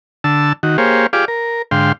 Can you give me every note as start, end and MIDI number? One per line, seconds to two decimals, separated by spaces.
0.24 0.53 50
0.24 0.53 81
0.24 0.53 88
0.63 0.77 51
0.63 0.77 66
0.78 1.07 58
0.78 1.07 67
0.78 1.07 68
0.78 1.07 72
0.78 1.07 73
0.78 1.07 77
1.13 1.25 65
1.13 1.25 67
1.13 1.25 68
1.13 1.25 74
1.13 1.25 77
1.13 1.25 86
1.28 1.62 70
1.71 1.92 44
1.71 1.92 50
1.71 1.92 77
1.71 1.92 79
1.71 1.92 84